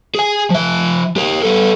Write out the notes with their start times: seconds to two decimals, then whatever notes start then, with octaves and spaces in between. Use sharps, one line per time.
0.15 G#4 G#5
0.50 F3 E5
1.16 G4 A#4
1.43 B3 A4